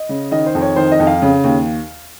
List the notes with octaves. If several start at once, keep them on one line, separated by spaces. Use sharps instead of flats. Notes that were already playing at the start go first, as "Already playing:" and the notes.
Already playing: D#5
C#3
D#3 D#5
C5
F2
C#5
D#3 C5
D#5
F2
F5
C#3
D#2